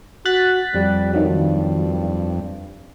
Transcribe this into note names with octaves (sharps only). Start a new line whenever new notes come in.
F#4 F#6 A6 B6
F2 G3
G2 D#3 F#3